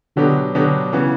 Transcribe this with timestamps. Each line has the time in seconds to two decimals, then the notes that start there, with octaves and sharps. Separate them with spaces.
0.16 B2 D3 F#3 B3 D4 G4
0.54 B2 D3 F#3 B3 D4 G4
0.93 C#3 E3 B3 F#4